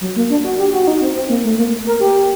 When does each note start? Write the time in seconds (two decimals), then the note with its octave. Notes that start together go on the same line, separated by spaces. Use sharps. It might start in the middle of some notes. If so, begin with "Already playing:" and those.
0.01 F#3
0.16 A#3
0.30 D4
0.44 F#4
0.58 G4
0.73 F#4
0.83 F#4
0.87 D#4
1.02 C4
1.15 C4
1.29 A#3
1.44 A3
1.58 A#3
1.87 A#4
2.00 G4